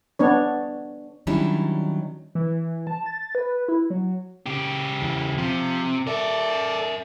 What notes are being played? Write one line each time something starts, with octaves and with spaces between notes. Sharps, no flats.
B3 D4 C#5
D#3 F#3 G3 C#4 D4 E4
E3
A5
A6
B4
E4
F#3
C#3 G4
E2
C3 F3
A4 A#4 D5 E5